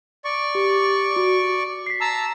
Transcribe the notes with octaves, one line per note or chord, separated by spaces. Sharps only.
D5 C#6
G4
F#4 D7
B6 C7
A5 A#5 E6